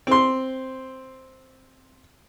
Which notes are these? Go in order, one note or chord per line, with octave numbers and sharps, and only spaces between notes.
C4 C6